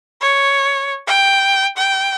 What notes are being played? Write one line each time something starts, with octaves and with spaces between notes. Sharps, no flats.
C#5
G5
G5